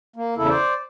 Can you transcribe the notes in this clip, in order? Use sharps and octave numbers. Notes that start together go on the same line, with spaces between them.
A#3
E2 C#3 E4 A4
C5 D5